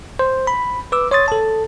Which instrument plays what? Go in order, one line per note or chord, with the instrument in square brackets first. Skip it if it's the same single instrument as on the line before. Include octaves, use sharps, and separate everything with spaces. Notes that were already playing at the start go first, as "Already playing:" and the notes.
[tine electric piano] C5
B5
B4 D6 E6
C#5 C6 D#6 A6
A4 A5